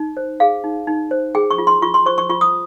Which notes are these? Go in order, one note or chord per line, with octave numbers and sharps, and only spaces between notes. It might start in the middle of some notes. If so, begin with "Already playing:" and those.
Already playing: D#4
C5
G#4 F5
D#4
D#4
C5
G#4 G5
C#6
F4
C6
F4 C#6
C6
C5 C#6
C#6
F4 C#6
D#6